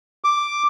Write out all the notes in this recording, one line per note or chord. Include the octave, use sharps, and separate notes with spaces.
D6